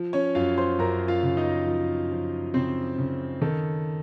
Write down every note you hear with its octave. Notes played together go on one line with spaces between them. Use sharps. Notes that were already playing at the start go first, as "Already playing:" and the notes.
Already playing: F3
C#4 C#5
F#2 F4 F5
C5 C6
F#2 A#4 A#5
F4 F5
C#3
D#4 D#5
F3
F3
C#3 C4 C5
C#3
D#3 A4